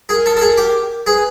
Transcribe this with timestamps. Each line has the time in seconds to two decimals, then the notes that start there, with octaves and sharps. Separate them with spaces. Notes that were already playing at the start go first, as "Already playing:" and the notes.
0.09 G#4 A#4
0.26 A4
0.37 A4
0.41 G#4
0.57 G4
1.06 G#4 B4